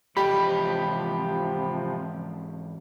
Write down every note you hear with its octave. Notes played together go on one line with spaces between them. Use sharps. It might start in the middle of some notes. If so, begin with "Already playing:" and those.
G#2 C3 E3 F3 G4 D#5 B5